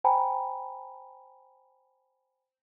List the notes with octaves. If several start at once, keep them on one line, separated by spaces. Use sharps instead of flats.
C5 G5 G#5 A#5 B5